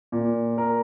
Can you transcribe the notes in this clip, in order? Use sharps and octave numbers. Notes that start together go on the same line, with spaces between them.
A#2
A#4